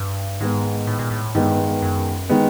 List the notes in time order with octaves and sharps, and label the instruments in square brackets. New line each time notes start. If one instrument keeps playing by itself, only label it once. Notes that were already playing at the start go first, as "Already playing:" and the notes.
Already playing: [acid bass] G2
[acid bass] G#2 [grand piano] D#3 G#3 B3
[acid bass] A2
A#2
A2
[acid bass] G2 [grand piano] D#3 G#3 B3
[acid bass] F#2
[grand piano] D#3 G#3 B3